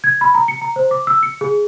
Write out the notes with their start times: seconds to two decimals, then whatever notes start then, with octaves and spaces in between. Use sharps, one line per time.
0.04 G#6
0.21 B5
0.35 A#5
0.48 C#7
0.62 A#5
0.76 C5
0.91 D6
1.07 E6
1.23 C#7
1.41 G#4